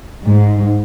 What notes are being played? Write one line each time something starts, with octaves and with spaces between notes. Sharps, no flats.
G#2